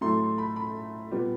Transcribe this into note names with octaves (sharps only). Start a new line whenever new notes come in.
A2 F#3 A3 C6
C6
B5
B5
A#2 G3 B3